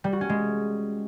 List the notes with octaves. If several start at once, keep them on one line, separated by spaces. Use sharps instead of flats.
G3
F#4
C#4
G#3